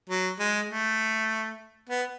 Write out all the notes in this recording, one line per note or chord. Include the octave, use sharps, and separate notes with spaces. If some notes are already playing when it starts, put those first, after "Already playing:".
F#3
G#3
A3
B3